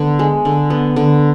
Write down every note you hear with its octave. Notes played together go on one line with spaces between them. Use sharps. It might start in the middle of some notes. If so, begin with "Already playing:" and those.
Already playing: D3 B3
G#3
D3
B3
D3